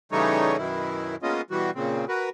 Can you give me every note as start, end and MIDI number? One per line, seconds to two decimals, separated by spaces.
0.12 0.57 49
0.12 0.57 52
0.12 0.57 55
0.12 0.57 57
0.12 0.57 63
0.12 0.57 73
0.57 1.16 42
0.57 1.16 47
0.57 1.16 51
0.57 1.16 64
1.23 1.41 56
1.23 1.41 58
1.23 1.41 59
1.23 1.41 61
1.23 1.41 65
1.23 1.41 75
1.50 1.71 47
1.50 1.71 52
1.50 1.71 55
1.50 1.71 66
1.75 2.05 46
1.75 2.05 49
1.75 2.05 60
2.08 2.29 66
2.08 2.29 70
2.08 2.29 71